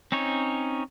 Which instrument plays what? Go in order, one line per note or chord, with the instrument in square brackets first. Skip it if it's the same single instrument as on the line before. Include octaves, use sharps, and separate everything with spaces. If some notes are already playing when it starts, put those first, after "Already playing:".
[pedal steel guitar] C4 C#4 D#4 C#5